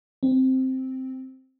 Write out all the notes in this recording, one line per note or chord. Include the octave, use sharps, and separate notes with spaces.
C4